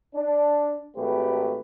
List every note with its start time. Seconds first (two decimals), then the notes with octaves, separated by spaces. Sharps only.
0.14 D4
0.96 G#1 A3 G4 B4